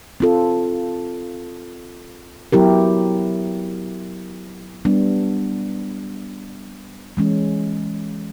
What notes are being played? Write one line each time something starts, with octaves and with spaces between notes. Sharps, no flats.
C4 F4 A4
F#3 B3 E4 G4 A#4
G3 B3 D4
E3 G#3 C#4